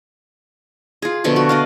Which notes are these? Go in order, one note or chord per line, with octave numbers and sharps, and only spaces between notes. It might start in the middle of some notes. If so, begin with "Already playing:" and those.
F4 G#4
B2 D3 F3 A3
F#4
D5 D#5 F5